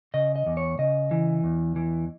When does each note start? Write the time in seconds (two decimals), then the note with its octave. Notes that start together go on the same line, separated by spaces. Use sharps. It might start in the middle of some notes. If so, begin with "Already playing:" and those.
0.14 C#3 D#5
0.36 D#5
0.46 E2
0.57 C#5
0.79 C#3 D#5
1.11 E3
1.44 E2
1.76 E3